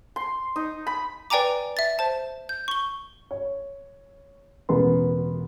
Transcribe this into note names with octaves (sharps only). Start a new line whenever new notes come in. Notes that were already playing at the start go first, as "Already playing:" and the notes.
C6
D#4
B5
B4 D5 G5 G#5 A#5 D6
E5 A6
C5 A5
G6
C#6 G7
C#5
E1 A1 B3 A#4 B4 C6